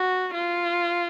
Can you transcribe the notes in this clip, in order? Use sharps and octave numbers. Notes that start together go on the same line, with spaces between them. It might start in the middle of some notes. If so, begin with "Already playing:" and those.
Already playing: F#4
F4